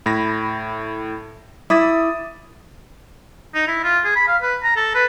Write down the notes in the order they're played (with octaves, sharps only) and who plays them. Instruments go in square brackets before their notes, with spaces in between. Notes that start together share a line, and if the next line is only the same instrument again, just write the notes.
[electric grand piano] A2 B5 A#6
[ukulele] E4 [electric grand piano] D6 D#6 A6
[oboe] D#4
E4
F4
G#4
B5
F5
B4
A#5
A4
B4